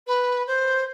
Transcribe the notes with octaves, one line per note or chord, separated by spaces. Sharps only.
B4
C5